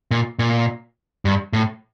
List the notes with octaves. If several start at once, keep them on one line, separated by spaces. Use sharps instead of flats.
A#2
A#2
G2
A2